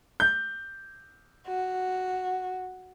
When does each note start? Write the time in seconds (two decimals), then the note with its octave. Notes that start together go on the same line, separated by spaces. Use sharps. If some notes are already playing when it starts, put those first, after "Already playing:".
0.20 G6
1.47 F#4